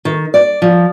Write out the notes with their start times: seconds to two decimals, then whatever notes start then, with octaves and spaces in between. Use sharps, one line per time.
0.05 D#3
0.34 D5
0.62 F3